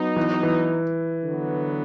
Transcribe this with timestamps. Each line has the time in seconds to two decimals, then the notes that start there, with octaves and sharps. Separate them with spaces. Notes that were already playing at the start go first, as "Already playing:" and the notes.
Already playing: F#3 B3 D#4
0.16 E3
0.43 E3
1.24 D3 F#3 B3